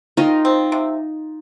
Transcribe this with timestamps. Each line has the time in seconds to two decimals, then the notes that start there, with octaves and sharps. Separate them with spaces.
0.17 D#3 D#4 F4
0.45 C4
0.72 C3